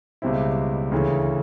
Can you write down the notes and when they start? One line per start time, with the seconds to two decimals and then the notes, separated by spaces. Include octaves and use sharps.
0.22 C#2 B2 G3 C4 E4
0.92 D2 C#3 E3